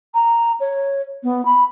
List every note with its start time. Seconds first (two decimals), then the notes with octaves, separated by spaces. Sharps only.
0.14 A#5
0.60 C#5
1.23 B3
1.45 B5